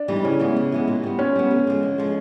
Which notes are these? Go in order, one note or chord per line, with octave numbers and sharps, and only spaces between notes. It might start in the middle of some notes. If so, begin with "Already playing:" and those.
Already playing: D4
E3 G3 C4 D#4
C#3 C#4
E3 G#3 B3
C#3
E3 G#3 B3
A#2
G3 B3
A#2 C#4
G3 B3
D3
F3 G#3
D3
F3 G#3